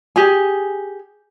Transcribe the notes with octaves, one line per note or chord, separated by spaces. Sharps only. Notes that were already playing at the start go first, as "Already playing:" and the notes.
G4 G#4 G#5